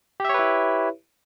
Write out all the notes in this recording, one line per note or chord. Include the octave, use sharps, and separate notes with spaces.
E4 G4 B4 C#5 E5